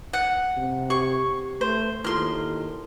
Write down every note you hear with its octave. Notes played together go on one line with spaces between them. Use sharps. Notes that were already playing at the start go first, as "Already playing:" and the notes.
F#5
C3
G4 C#6
A3 C5
D#2 E4 F4 A4 C6 F6